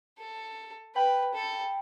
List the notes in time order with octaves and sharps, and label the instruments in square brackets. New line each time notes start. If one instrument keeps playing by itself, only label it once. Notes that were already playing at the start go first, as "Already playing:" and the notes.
[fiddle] A4
[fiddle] B4 [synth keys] G5 B5
[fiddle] A4